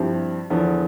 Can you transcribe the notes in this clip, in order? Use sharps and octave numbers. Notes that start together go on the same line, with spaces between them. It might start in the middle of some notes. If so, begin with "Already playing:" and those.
Already playing: G2 F3 C4 E4 G4
E2 D3 F3 B3